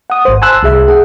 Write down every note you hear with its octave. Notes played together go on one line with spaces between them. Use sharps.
F#5 D#6
G#1 C5
G#5 A5 B5 C6 E6 F#6
C2 G#4 E5
G#4 F#5